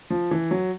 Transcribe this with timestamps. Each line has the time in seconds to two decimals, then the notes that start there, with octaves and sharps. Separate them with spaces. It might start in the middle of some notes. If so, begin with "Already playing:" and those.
0.10 F3
0.31 E3
0.51 F#3